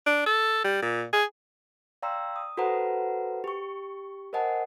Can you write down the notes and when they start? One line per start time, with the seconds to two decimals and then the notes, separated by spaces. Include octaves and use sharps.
0.07 D4
0.26 A4
0.65 G3
0.83 A#2
1.13 G#4
2.02 D5 F5 G5 A#5 C6 E6
2.36 D#6
2.57 F#4 A4 B4 C5 F#5 A#5
3.44 G4 C#6
4.33 A#4 C5 D#5 F#5 G#5 A5